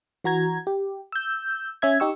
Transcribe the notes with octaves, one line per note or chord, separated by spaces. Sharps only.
E3 F#4 A#5 G#6
G4
E6 G6
C#4 E5 G#6
D#4 G4 C#6 E6